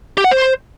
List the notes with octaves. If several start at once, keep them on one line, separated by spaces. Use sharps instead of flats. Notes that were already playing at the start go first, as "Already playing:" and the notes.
G4
F#5
C5